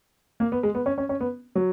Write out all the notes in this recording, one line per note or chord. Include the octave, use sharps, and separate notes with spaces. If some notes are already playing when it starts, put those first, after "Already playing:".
A#3
B3
G#3
B3
C#4
C#4
C#4
B3
F#3